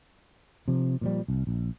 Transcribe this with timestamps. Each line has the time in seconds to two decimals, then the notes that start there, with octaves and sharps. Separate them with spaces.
0.68 C3 F3
1.01 A#2 F3 G3
1.28 C2
1.47 A#1